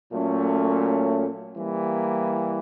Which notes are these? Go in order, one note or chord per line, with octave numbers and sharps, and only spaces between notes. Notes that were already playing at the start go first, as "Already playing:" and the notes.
A#2 F#3 A3 C#4
E3 G3 A#3